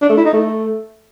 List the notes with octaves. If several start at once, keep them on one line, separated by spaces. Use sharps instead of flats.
D4
A3
E4
D#4
A3